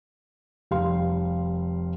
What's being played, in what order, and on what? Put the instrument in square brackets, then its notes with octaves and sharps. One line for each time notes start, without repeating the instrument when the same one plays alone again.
[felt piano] F1 G3 F5 C6